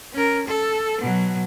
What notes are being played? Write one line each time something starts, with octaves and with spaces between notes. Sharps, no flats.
C#4 A#4
A4
B2 F#3